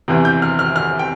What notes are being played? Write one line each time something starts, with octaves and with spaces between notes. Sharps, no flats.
E2 C3 E3
G6
F6
F6
F6
G5